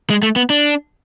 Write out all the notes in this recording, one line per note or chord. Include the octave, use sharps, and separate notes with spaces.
G#3
A3
B3
D4